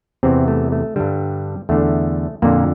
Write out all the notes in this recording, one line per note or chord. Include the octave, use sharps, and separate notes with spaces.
E2 C3 E3 C4
A3
A3
G2 D3 G3
E2 D3 A3
F2 A#2 D3 A#3